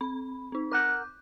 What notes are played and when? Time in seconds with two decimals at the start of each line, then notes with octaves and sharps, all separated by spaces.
0.01 C4 B5
0.52 C4 D#4
0.71 A#4 F#5 D6 F#6 G6